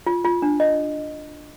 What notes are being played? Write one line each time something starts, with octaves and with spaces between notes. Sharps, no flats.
F4
F4
D4
D#5